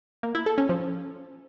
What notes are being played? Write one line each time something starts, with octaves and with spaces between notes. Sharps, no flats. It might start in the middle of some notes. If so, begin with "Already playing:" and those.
A#3
E4
A4
C#4
F3